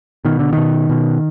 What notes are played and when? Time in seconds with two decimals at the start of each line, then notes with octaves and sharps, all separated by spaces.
0.25 B2 D#3
0.39 D3
0.53 B2 D#3
0.89 B2